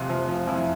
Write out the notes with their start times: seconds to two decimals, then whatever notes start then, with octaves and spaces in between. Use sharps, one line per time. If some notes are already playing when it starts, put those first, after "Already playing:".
Already playing: F2 C3
0.10 F3
0.29 F3
0.47 F2 E4